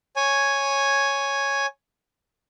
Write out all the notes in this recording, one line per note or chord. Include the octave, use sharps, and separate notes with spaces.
C#5 G#5